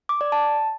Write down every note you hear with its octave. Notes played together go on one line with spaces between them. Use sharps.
D6
D5
A5